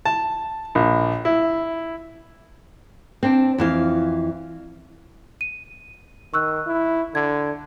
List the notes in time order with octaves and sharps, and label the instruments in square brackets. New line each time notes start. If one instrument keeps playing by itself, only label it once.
[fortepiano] A5
A#1
E4
[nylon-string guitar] C4 D4
F2 E3 F5
[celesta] D#7
[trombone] D#3 [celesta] C#6 E6 F#6
[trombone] E4
[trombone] D3 [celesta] G#6